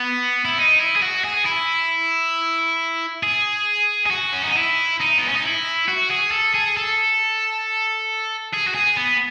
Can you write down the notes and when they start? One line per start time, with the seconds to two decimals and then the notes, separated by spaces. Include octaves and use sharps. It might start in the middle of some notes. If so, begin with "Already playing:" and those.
Already playing: B3
0.45 E4
0.58 D#4
0.79 E4
0.96 G#4
1.02 F#4
1.25 G#4
1.46 E4
3.23 G#4
4.07 G#4
4.11 F#4
4.33 C#4
4.44 D#4
4.56 E4
5.00 D#4
5.18 B3
5.27 C#4
5.36 D#4
5.44 E4
5.88 F#4
6.11 G#4
6.32 A4
6.54 G#4
6.77 A4
8.53 G#4
8.67 F#4
8.75 G#4
8.97 B3